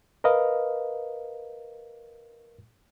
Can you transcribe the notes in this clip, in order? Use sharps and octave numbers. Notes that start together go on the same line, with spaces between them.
A#4 B4 D#5 F5